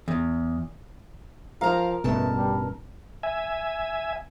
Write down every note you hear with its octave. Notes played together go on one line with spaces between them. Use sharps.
E2
F3 A#4 F5 A#5
A1 G2 B2 A3 A5
G3
E5 G#5